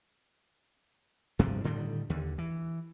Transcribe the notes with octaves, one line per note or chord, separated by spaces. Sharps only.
G2 C3 F3 G3
A2 D3 D#3 G3
D#2 D3
E3